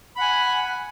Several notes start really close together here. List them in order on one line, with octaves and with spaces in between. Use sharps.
B5 F#5 G#5